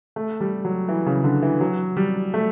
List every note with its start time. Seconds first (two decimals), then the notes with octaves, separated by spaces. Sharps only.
0.16 A3
0.41 G3
0.65 F#3
0.89 E3
1.06 C#3
1.24 D3
1.42 E3
1.60 F#3
1.97 G3
2.34 A3